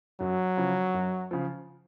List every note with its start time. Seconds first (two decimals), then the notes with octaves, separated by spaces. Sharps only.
0.20 F#2 F#3
0.57 C#3 F3
0.94 F#2
1.31 C#3 F3